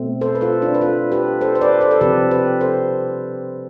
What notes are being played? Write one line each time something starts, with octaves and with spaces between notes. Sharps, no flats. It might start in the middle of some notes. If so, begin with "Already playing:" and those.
Already playing: B2 A3 C4
A4 C5
B4
F4 A4
D4 F4
B4
F4 A4
G4 B4
A4 C5
C5
B4 D5
A4 C5
A4
C3 F3 C4 G4 B4
G4 B4
A4 C5